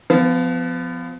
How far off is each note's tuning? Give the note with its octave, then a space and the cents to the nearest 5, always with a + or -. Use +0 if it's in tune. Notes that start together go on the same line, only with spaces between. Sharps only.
F3 +0 B3 +35